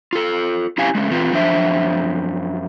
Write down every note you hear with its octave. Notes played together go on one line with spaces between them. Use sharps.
F4 A4
C#4 E4 G4 F5 G#5
G#3 A3 C#4
E3 C4 F4 B4
F#2 F3 D4 C5 E5